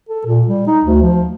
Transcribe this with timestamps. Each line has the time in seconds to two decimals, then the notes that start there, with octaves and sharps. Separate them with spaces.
0.09 A4
0.26 A#2
0.47 G3
0.67 D#4
0.84 D2
1.02 F3